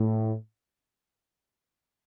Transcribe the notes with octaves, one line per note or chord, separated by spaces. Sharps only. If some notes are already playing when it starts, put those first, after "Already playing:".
Already playing: A2